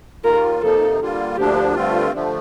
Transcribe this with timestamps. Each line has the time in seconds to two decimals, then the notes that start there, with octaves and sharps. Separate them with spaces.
0.24 D#2 D#3 A#3 F4 A#4
0.61 F2 C3 F3 A#3 D#4 A4
1.00 D3 G3 A#3 F4
1.37 D2 D3 F3 A#3 D4 G4
1.74 G2 D3 A3 C4 F4
2.12 D3 F3 A3